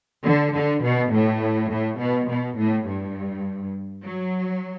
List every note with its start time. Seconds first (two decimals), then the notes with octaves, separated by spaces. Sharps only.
0.24 D3
0.53 D3
0.82 B2
1.12 A2
1.69 A2
1.99 B2
2.29 B2
2.57 A2
2.87 G2
4.04 F#3